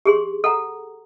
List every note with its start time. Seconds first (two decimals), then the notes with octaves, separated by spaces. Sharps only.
0.06 G4 G#4 C6
0.44 A4 F#5 A#5